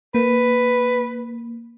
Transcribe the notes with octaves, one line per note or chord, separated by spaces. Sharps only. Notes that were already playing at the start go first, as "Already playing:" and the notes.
A#3 B4